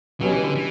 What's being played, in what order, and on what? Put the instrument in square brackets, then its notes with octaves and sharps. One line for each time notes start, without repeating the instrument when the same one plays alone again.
[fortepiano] C#2 B2 G3 C#4 [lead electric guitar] F#3
[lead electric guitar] E3
D3
E3